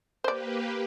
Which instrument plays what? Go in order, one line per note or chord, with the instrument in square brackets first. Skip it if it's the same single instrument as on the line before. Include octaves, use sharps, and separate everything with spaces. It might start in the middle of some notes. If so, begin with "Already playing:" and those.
[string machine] A#3 G4 B4 [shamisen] C5 D5